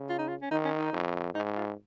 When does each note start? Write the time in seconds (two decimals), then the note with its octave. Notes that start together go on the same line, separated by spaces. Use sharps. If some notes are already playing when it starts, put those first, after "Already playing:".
Already playing: C#3
0.09 F4
0.18 D#4
0.28 F4
0.42 C#4
0.51 D#3 D#4
0.65 C#4
0.79 D#4
0.93 F2
1.35 G#2 D#4
1.57 F4